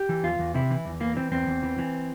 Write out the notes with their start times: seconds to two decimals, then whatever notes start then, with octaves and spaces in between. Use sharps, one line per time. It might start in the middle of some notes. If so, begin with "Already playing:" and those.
Already playing: G4
0.09 E3
0.23 E2 F4
0.39 E2
0.54 C3 E4
0.70 E3
0.85 E2
1.00 E3 A#3
1.17 E3 C4
1.32 E2 C4
1.47 E2
1.63 E3
1.79 E3